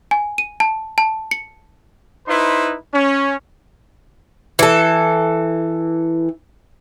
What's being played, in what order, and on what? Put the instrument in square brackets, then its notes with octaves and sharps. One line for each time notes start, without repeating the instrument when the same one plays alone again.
[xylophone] G#5
D#7
A5
A5
C#7
[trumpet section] D#4 E4 B4 C5 C6
C#4
[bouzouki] E3 A4